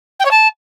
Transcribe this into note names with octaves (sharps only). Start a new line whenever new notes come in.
G5
C#5
A5